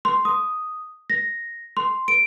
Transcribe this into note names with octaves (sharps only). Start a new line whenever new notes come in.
C6
D#6
A#6
C6
D7